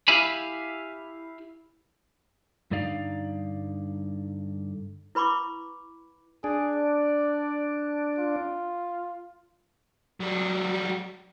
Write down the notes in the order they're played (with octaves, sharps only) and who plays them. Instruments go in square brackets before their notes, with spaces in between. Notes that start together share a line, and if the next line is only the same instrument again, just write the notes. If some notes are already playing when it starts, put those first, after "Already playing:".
[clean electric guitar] E4 G4 E5 F5 G#5 B5
G2 D3 D#4 D5 F5
[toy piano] E4 B4 B5 C#6 D6
[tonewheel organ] D4 [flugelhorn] G#4
[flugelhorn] D5
F4
[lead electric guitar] F#3 G3